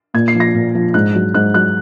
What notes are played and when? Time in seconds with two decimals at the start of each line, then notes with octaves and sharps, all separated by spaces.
0.14 A#2 G#6
0.28 C7
0.35 F3
0.40 A#6
0.55 A#2
0.75 F3
0.94 G#2 F#6
1.15 F#3
1.34 G#2 F#6
1.54 F#3 F#6